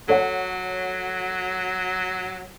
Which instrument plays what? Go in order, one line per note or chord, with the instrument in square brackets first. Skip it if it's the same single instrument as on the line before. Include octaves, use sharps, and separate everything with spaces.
[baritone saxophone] F#3 [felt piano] A4 C#5 F#5